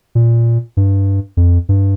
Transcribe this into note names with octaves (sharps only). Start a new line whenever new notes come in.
A#2
G2
F2
G2